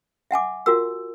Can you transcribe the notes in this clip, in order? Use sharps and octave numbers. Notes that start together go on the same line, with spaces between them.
E5 F#5 G#5 D6
F4 F#4 A#4 E6